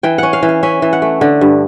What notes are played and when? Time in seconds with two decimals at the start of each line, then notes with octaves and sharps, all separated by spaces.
0.03 E3 G5
0.18 C#4 F#5
0.33 F5
0.43 E3
0.49 F5
0.63 C#4 E5
0.82 E3
0.93 F#5
1.02 A3
1.21 D3
1.41 G2